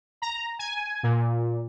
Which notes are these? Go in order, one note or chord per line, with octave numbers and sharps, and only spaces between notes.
A#5
G#5
A#2